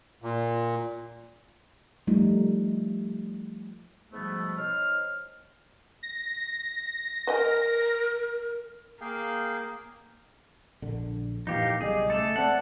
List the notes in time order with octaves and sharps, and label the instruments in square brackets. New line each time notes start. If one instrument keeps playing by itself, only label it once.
[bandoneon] A#2
[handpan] F3 G3 A3 D#4 F4
[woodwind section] G#2 B2 F3 G3 A3 B3
D#4 C5 C#5 F6
[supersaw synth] A#6
[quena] A#4 [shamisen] B4 D#5 G#5
[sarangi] A#3 [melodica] G#4 F5 G5
[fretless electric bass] A#1 D3
[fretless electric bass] A#2 E3 F3 [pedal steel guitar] D#4 G4 [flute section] F5
[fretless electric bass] B1 C#3 G3 [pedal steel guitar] G#4 [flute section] D#5 D6
[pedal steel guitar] A3 A4
[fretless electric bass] A3 C4 [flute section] C#5 D5 A5 [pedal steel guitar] F#5